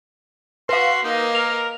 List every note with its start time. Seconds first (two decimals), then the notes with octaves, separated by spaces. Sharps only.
0.69 F#4 B4 F5 C6
1.04 A#3 D#4 D#5
1.35 A#4 F7